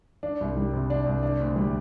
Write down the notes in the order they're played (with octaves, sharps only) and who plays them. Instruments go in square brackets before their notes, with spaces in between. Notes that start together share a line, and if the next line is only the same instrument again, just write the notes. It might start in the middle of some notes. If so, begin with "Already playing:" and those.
[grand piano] D4
C2
G3
C3
D4
C2
D4
D2
G3